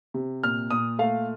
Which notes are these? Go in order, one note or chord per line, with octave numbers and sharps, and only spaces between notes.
C3
A#2 F6
A#2 D#6
A3 F5